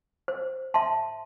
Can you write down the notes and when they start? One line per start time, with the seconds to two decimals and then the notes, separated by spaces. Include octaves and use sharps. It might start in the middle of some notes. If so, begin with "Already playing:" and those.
0.28 C5
0.74 E5 A5 C6